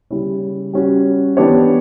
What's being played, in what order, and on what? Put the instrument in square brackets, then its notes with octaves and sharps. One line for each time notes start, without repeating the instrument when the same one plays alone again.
[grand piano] C#3 G3 C#4 E4
G3 C#4 F#4
E3 B3 D4 G4 C#5